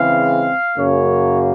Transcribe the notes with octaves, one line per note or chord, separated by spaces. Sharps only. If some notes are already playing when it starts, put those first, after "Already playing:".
Already playing: C#3 E3 G#3 C4 F5
F#2 C#3 F#3 A#3 C#5